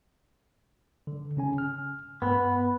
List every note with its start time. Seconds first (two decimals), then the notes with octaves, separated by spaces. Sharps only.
1.07 D3
1.37 C#3 C#4 G#5
1.58 F6
2.22 G2 B3